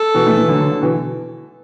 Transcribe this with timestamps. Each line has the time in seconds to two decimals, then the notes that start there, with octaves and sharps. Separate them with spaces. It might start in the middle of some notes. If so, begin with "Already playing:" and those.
Already playing: A4
0.14 B2 E3
0.26 E3 A3
0.38 E3 A3
0.48 D3 F#3
0.60 D3
0.71 D3
0.82 B2 E3